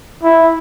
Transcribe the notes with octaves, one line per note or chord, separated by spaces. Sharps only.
E4